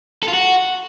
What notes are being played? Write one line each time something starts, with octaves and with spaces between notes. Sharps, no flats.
A4
F4
F#4